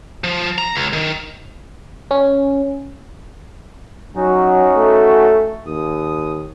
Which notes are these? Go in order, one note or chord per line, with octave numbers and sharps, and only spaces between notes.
F3
A#5
C#2
D#3
C#4
F#3 C#4 D#4 F#4
A3
D#2 D#6